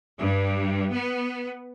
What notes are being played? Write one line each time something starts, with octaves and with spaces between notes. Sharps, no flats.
G2
B3